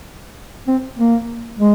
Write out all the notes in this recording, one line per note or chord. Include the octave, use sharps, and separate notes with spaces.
C4
A#3
G#3